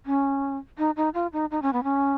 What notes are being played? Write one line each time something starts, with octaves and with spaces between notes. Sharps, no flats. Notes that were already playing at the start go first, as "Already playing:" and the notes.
C#4
D#4
D#4
F4
D#4
D#4
C#4
B3
C#4